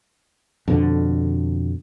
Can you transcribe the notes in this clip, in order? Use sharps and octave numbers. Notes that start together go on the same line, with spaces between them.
F2 B2 D3